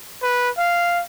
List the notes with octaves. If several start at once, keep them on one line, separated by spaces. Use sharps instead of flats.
B4
F5